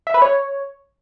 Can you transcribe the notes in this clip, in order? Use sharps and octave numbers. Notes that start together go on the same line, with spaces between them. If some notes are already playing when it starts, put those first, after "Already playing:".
E5
B4
C#5